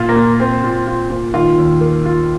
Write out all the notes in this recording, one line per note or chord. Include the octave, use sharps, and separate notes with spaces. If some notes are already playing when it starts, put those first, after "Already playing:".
Already playing: A#2 F4
A#3
A#2
A#3 C4
A#2
F4
A#2
D#3 F4
D#2
A#3
F4